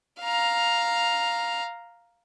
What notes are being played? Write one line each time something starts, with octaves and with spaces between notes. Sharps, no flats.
F5 A#5